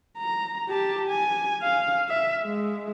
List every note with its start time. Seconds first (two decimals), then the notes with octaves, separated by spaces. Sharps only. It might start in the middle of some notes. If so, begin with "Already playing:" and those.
0.18 A#5
0.69 G4 A5
1.09 G#5
1.62 F5
2.09 E5
2.45 G#3